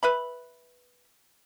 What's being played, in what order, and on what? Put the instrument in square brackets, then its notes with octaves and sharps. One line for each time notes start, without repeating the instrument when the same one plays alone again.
[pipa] B4 E5 B5